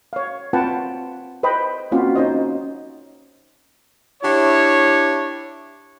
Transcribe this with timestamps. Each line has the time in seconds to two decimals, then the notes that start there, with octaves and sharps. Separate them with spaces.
0.13 C#5 F5
0.53 C4 F4 B4 F#5 G5 A5
1.43 B4 C5 D#5 G5 B5
1.92 A#3 C4 C#4 F4 F#4
2.15 C#4 D#4 C5 D#5
4.23 D4 E4 G4 C#5